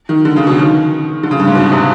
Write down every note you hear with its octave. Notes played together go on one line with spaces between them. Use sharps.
D#3
D3
C#3
B2
D#3
D3
C#3
G2
G#2
B2
C3